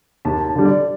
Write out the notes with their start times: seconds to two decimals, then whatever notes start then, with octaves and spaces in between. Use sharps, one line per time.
0.25 D#2 A5
0.45 A5
0.55 D3 G3
0.65 D5